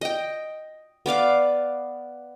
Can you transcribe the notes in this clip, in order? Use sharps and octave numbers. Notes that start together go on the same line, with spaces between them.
D#5 G5
B3 D5 F5 D6